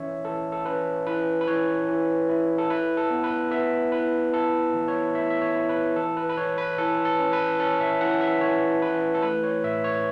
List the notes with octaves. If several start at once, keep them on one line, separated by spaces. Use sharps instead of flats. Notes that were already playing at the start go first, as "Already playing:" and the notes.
Already playing: E3 C#4 C#5 E5
E3 A4
A4
C#4 B4
E3 B4
B4
E3 C#5
E3
E4
A4
E4 B4
A4
B3
B4
B3 E5
E4 B4
E4 A4
E3
C#5
E4 E5
E5
C#5
E4
B4
E3 A4
B4
B4
E3 C#5
B4
E3 A4
A4
C#4
B4
C#4 A4
E5
E3 F#5
E5
E3 C#5
E3 B4
A4
A3 B4
C#5
A2 E5
C#5